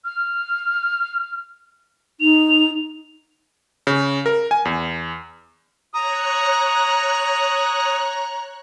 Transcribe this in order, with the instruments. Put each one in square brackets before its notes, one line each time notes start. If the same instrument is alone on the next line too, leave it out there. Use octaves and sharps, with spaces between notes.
[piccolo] F6
[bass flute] D#4 [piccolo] F7
[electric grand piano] C#3
A#4
G#5
E2
[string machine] C#5 F#6 [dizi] A#5 [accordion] D#6